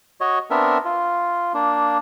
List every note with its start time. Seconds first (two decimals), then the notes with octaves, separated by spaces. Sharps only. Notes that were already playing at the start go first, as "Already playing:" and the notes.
0.21 F#4 C#5 D#5
0.51 B3 C4 D4 A#4 E5
0.85 F4
1.54 A#3 D4